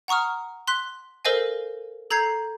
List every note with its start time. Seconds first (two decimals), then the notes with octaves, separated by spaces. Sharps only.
0.08 F#5 A#5 C#6 D#6 F6
0.68 C6 F#6 B6
1.25 A4 A#4 C5 D#5 F5 G#5
2.10 A4 A#5 G6 G#6 C7